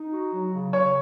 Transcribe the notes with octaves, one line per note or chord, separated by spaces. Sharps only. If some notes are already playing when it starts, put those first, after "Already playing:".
Already playing: D#4
F#4
F#3
C#3
C#3 C#5